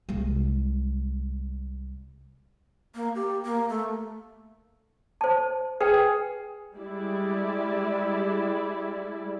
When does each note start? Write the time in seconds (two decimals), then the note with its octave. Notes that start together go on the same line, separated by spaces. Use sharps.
0.09 C2 G#3
2.95 A#3
3.15 G4
3.45 A#3
3.69 A3
5.21 C5 A5
5.81 G#4 B4 G5
6.75 G3 G#3 E4 D5